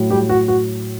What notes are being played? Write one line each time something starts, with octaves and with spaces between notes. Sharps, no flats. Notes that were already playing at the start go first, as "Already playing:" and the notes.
Already playing: A2 F#3
G3 G4
F#4
F#4